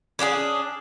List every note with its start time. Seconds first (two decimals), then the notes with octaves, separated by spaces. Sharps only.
0.19 C#4 D4 F#4 G#4